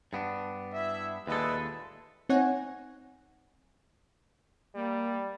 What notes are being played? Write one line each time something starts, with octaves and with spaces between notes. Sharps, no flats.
G2 B3 D4
E4 E5
D#2 A#2 G#3 A4 B4 E5
C4 D#4 C#5 F#5 G#5
G3 A#3